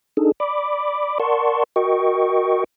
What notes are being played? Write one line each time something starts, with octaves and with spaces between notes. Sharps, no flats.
D4 D#4 G#4 A4
D5 B5 D6
A#4 D5 F#5 A5 C6 C#6
F#4 A#4 D#5 G5 C#6